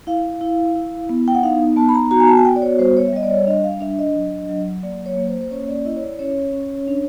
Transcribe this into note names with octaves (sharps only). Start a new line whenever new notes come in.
E4 F5
E4
E4
B3
G5
F#5
D#4 F5
B3 A5
B5
A#5
F#4 A#5
G#5
A5
G#5
B3 G5
D5
C#5
G3 C5
C#5
E5
G3 D#5
D5
C#5
D4 D#5
F5
D4 E5
D#5
F#3
F#3
A#3 D5
C#5
A#3
C5
C5
C#4 C#5
D5
E4 D#5
C#5
D5
C#4 C#5
C#4
D4